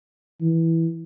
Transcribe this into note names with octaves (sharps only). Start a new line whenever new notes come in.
E3